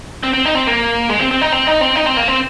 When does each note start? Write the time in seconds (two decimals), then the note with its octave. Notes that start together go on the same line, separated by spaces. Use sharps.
0.23 C4
0.33 C4
0.45 D#4
0.55 C4
0.67 A#3
1.09 G#3
1.20 C4
1.31 C4
1.41 D#4
1.52 C4
1.67 D#4
1.81 C4
1.96 D#4
2.06 C4
2.17 A#3
2.28 C4